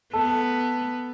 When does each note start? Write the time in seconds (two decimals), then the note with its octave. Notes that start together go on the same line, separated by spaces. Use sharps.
0.13 B3 A4